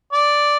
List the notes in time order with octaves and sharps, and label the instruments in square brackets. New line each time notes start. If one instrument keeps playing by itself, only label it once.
[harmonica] D5